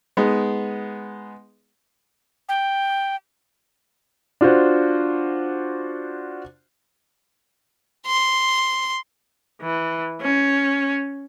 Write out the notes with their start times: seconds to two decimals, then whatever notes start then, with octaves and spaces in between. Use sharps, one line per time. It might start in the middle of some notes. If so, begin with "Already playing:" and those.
0.17 G#3 B3 D#4
2.49 G5
4.41 D4 F4 F#4 C5
8.06 C6
9.62 E3
10.21 C#4